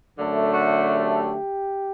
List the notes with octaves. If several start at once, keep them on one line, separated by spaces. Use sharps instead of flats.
F#2 D3 A3
F#4
G4